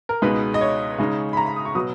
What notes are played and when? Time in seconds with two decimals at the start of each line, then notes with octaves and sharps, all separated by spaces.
0.09 A#4
0.22 C#2 B2 G#3 B3 D#4 B4
0.54 D#5
0.61 C#5
0.98 C#3 G#3 D#4
1.33 B5
1.37 A#5
1.46 B5
1.56 D#6
1.65 C#6
1.75 B2 F#3 B3 D#6